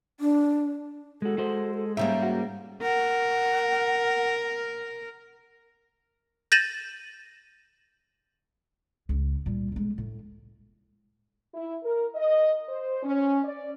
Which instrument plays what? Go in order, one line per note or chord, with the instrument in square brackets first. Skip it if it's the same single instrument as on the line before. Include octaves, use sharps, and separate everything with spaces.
[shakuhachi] D4
[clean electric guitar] G#3 F#4 [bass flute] A4
[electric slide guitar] G#3 [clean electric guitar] F#4 C5
[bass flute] A4
[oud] G#2 G3 A#3 [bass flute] C#4 [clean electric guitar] E5
[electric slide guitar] F#4
[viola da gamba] A#4 [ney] F#5
[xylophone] G6 A6 A#6 D#7 E7 F#7
[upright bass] C#2
A#2 G3
B1 G#3
A2
[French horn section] E4
A#4
D#5
C5
C#4
D5